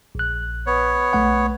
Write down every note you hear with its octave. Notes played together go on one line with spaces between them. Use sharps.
A#1 F#6
B3 C#5
B1 A3 F#5